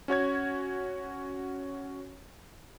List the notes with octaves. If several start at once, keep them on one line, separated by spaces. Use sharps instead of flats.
C#4 F#4 C#5 G#6